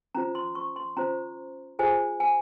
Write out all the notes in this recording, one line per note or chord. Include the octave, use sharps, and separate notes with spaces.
C#4 F4 C5 A#5
C6
C#6
C6
C#4 F4 C5 A#5
F4 G#4 C5 G#5
G#5